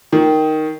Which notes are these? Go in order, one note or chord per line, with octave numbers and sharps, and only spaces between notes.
D#3